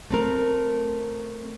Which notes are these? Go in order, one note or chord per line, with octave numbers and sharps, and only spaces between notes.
A3 C4 A#4